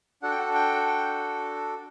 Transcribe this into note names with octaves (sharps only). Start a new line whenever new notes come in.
D4 F#4 A4 F#5
G5
F#5
G5
G5